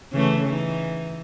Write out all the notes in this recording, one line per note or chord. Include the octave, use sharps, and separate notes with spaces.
C#3 E3 A3
E3 D#4